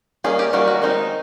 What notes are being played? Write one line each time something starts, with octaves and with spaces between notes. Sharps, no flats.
D#3 G3 A#3 C#4 G#4
G4
D#3 G3 A#3 C#4 F#4
F#4
D#3 G#3 C4 D#4